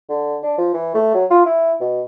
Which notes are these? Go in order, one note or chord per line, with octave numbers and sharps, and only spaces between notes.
D3
D4
F3
E3
A3
F#3
F4
E4
B2